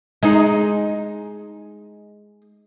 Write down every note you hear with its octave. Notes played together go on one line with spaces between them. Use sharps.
G#3 D#4